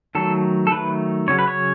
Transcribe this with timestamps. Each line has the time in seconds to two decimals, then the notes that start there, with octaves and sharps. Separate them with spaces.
0.15 D#3 F#3 A3 A4
0.67 A4
0.71 D#3 F#3 A3 B4
1.28 C#3 F#3 C#4 C#5
1.39 B4
1.48 C#5